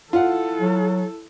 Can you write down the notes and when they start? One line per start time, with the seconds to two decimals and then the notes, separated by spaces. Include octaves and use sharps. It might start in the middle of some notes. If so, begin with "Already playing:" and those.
0.13 E4 F4 A4 F#5
0.61 F#3